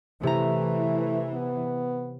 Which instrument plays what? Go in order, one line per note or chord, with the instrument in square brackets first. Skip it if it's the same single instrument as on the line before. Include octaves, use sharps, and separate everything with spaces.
[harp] C3 A#5 [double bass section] E3 [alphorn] A3
[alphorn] B3